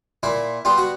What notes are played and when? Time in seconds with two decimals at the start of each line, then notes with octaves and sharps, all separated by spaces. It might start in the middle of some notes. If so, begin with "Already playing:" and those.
0.23 A#2 E4
0.65 G3 B3 F4
0.78 F#4